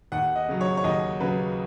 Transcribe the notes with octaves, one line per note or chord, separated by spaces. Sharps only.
D#2 F#5
D#5
C#3 F#3
C#5
C#5
D#2 D#5
C#3 F#3 B4